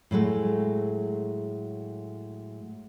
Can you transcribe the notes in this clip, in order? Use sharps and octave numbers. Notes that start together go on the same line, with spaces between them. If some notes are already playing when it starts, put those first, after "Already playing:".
A2 F#3 G#3 A3